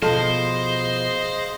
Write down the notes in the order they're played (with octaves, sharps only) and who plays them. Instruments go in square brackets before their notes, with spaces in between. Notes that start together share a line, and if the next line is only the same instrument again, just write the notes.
[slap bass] B2 F3 [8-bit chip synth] G#4 D#5 F5 [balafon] A4 A5 [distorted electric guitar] C5